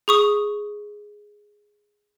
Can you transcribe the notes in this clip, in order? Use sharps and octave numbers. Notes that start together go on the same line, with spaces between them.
G#4 C#6 D#6